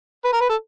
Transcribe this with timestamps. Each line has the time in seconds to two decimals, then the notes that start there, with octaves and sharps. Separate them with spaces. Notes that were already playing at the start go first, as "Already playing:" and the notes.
0.24 B4
0.33 A#4
0.40 B4
0.49 A4